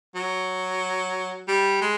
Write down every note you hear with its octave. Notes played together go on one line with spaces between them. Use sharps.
F#3
G3
G#3